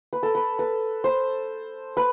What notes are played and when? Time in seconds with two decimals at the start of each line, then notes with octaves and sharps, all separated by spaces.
0.13 B4
0.23 A4
0.35 B4
0.59 B4
1.04 C5
1.97 B4